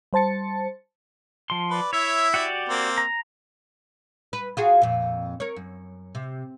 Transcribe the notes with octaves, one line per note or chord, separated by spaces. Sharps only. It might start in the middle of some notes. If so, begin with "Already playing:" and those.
G3 C5 A5 A6 C#7
F3 C6
B4 D5
E4 C#5 E5
F#4 G4 D5
A#3 C4
A#5
B4
F4 F#4 G#4
F2 A#2
A#4 C#5
F#2
C3